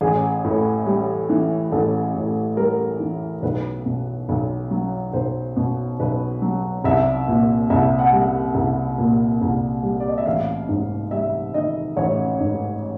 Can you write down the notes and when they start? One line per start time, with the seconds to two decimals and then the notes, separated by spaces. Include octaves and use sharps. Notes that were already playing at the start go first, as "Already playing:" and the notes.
0.01 A1 G#4
0.44 A2
0.87 G3
1.30 E3
1.72 A1 A4
2.14 A2
2.57 G3 A#4
3.00 E3
3.42 B1 B4
3.86 B2
4.29 B1
4.71 F#3
5.13 B1 C5
5.56 B2
6.00 B1 B4
6.42 F#3
6.84 C2 E5
7.28 A#2
7.70 C2 E5
7.99 F#5
8.13 G3
8.55 C2
8.98 A#2
9.41 C2
9.83 G3
10.00 D5
10.08 D#5
10.18 E5
10.26 A1 F5
10.69 G#2
11.11 G3 E5
11.54 D#3 D#5
11.97 A1 C#5
12.40 G#2